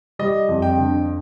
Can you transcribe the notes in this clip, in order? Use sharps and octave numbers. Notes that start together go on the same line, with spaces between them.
G3 D#5
F2
G5
D3